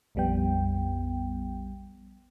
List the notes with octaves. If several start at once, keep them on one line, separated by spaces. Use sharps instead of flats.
A#1 F2 G3 B3 G5